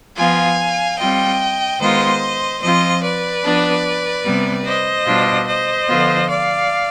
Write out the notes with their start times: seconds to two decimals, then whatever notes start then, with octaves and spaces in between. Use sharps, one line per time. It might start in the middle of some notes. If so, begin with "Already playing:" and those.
0.17 F3 B3 F4 F5 G#5
0.98 G3 C4 F4 D#5 G5
1.80 D#3 G#3 B3 F4 C5 D#5
2.61 F3 C4 F4 C5 D#5
3.02 B4 D5
3.43 F3 B3 D4
4.24 C3 G3 B3
4.65 C5 D#5
5.06 B2 G3 D4 F4
5.46 C5 D#5
5.88 D3 F3 B3 F4
6.28 D5 F5